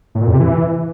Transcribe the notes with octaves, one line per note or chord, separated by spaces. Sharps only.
A2
A#2
F2
C3
E3